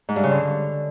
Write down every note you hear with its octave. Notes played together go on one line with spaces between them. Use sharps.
G#2
G2
C#3
D3